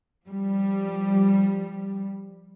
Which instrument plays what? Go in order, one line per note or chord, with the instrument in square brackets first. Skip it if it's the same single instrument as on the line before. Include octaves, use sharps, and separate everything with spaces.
[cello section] F3 G3